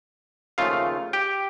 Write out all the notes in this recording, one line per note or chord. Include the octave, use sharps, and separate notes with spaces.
D#2 C#3 F3 A3 F4 F5
G4 G5